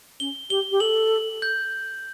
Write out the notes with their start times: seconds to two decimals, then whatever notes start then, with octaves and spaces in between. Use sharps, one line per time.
0.20 C#4 G7
0.50 G4 G7
0.71 G4
0.80 A4 F#7
1.42 G6